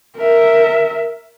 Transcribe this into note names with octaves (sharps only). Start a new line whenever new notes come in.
A#4 E5